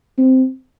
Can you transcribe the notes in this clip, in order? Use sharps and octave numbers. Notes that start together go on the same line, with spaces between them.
C4